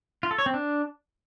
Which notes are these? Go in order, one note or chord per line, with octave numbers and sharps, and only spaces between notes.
F4
A4
C#5
C4
D4